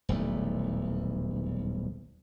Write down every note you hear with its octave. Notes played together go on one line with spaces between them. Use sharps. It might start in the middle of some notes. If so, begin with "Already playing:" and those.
D#1 B1 E2 A3